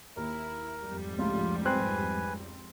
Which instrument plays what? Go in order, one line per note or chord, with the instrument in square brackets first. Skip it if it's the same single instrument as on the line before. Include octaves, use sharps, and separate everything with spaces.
[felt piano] D#2 [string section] E4 [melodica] A#4
[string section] F2 G#2 G3
[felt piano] C#2 A2 [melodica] F4
[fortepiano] C4 C5 F#6 [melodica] B4 G#5